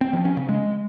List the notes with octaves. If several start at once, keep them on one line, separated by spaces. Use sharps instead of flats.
C4
F3
C#4
C#3
G#3